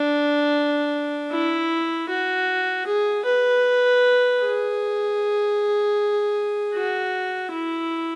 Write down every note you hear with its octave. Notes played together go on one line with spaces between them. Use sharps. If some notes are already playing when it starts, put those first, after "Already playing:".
Already playing: D4
E4
F#4
G#4
B4
G#4
F#4
E4